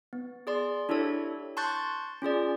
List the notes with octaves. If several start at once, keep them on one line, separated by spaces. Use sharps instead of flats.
B3
G#4 D5 C6
D4 E4 G4 A4 C#5
A5 C6 C#6 F#6 G6 A6
C#4 F4 G#4 D5